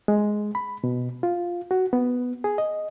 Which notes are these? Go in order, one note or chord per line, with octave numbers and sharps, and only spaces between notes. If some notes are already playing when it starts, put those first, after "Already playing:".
G#3
B5
B2
F4
F#4
B3
G#4
D#5